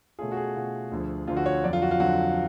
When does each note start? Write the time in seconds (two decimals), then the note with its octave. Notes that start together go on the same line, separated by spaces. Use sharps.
0.19 B2 A3 C#4 F4 G#4
0.32 F#4
0.37 G#4
0.55 B2 A3 C#4 F4
0.92 D2 D3 F3
1.27 D2 D3 F3 F4
1.37 F#4
1.46 C#5
1.64 F2 D3 F#3 D5
1.73 F4
1.82 F#4
1.91 F4
2.00 F2 D3 F#3 F#4